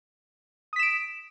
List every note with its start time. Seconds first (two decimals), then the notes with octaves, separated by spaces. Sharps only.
0.73 D#6
0.76 B6
0.79 E7
0.83 D7